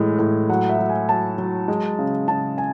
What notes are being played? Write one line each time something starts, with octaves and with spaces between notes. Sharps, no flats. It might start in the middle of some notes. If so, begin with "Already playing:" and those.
Already playing: A2 E3 G#3
A2
F#3 F#5
E5
F#3
G#5
F#3 A5
F#3
G#3
C#3
C#3 A5
G#5